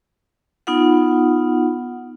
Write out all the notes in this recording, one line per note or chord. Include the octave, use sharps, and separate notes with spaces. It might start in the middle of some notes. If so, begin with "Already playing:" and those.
B3 D#4 F4 F#5